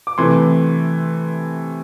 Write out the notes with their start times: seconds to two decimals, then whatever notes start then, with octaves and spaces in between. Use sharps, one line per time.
0.07 D6
0.18 C3 E3 A3 C6